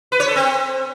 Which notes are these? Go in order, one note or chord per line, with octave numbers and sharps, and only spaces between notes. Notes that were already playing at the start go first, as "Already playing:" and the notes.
B4
C#5
A4
C4